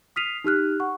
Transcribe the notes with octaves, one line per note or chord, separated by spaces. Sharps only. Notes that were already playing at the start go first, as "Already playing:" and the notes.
D#6 F6 B6 C7 D#7 F7
D#4 G4 F6 F#6
F#5 C#6